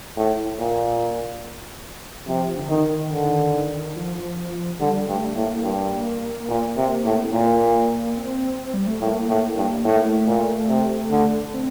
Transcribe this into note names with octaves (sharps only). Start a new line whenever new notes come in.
A2
A#2
C3 F3
D3
D#3
D3
D#3
D3 D#3
F3
D3 G3
G2 A3
A2 A#3
G2
A#2
C3
A2
C4
A#2 A#3
C4
G3
A3
A2 A#3
A2
G2
A2 A3
A#3
A3
A#2
C3
D3
C4